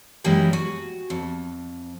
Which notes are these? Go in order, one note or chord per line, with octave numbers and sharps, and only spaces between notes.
F#2 E3 G3 G#3 A#3 B4
F#4 G#5
F2